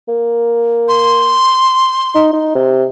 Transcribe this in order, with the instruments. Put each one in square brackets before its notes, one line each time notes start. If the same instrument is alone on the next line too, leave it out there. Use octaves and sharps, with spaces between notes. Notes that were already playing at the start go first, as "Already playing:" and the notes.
[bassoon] A#3
[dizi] C6
[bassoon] D#4
D#4
C3